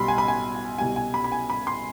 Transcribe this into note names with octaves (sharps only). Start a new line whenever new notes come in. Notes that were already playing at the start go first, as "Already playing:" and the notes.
Already playing: B1 B2 G3 B5 C6
G#5
B5
G#5
C2 B2 G3 G#5
G#5
B5
B5
G#5
B5
C6